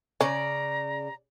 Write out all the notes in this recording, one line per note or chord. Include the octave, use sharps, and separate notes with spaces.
C#3 C#4 D5 A#5